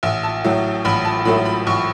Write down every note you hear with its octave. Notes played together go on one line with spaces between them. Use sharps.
A1 E5
A5
A2 F#3 A3
A1 B5
A5
A2 F#3 A3 B5
B5
A1 C#6